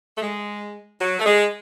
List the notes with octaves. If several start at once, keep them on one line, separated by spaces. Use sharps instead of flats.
A3
G#3
F#3
A3
G#3